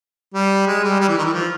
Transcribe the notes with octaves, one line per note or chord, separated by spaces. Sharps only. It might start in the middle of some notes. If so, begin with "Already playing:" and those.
G3
G#3
G3
G3
E3
D#3
E3
F3